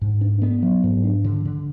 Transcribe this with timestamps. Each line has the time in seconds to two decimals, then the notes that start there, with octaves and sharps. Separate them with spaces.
0.01 G#2
0.21 D4
0.42 B3
0.62 F#3
0.83 G#2
1.04 D4
1.24 D3
1.45 D3